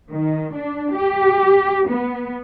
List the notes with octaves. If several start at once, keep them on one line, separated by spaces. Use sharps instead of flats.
D#3
D4
G4
B3